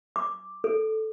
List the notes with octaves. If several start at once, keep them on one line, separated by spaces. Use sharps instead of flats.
D6
A4